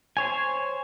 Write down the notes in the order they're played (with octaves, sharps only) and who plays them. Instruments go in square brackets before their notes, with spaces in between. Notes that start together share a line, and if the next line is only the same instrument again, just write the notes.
[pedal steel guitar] C5 C#5 G#5